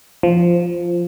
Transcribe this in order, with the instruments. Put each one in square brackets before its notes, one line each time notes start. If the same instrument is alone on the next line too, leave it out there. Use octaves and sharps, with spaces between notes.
[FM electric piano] F3